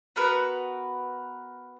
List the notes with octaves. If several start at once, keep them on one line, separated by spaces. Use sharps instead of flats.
B3 F#4 A#4 B4